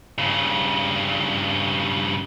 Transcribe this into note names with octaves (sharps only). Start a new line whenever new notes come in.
G2 C#3